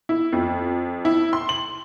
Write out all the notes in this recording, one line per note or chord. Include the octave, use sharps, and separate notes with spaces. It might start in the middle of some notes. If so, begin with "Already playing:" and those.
E4
F2
E4
C6
F#7